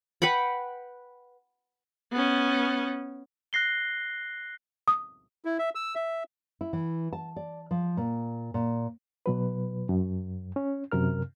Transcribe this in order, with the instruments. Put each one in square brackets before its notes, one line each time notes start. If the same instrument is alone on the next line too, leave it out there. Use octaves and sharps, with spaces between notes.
[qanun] B4 F#5 G5 B5
[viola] B3 C#4
[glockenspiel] F#6 A#6 C7 G7
[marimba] D#6
[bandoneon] E4
E5
E6
E5
[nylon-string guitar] E4
E3
A5
D5
F3
A#2
A#2
[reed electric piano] B2 F#3 B4
F#2
C#4
F#2 C3 A#4 F6